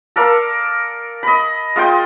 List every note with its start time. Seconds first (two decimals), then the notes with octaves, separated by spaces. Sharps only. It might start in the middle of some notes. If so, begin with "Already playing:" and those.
0.16 A4 A#4 D5 F5
1.23 D#5 B5
1.76 G#3 F4 D#5 G5